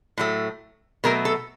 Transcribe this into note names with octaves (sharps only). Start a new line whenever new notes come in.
A2 F#3 A3
B2 F#3 A3 A#4
A4